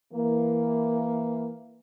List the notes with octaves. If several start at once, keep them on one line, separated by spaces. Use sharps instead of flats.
E3 A#3